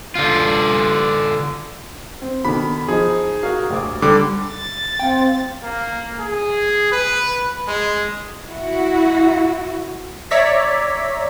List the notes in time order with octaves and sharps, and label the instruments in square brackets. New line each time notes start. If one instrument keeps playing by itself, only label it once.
[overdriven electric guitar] D3 F4
[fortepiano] C4
[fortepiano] B2 D3 D#3 [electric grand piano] B5
[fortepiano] F3 D#4 [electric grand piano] G#4
[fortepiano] F#4 A#4 F5
D2 G4 D6
[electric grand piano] D3 G3 D6
[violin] A6
[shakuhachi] C4 [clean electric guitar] F5 G5
[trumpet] A#3
G#4
B4
G#3
[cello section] E4 F#4
[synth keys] C#5 D5 E5 A#5 B6